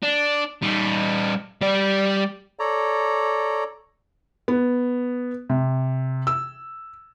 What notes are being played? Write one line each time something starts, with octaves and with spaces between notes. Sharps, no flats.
D4
G3 D#4
G3 D5
A4 C#5 D5 A#5
B3
C3
E6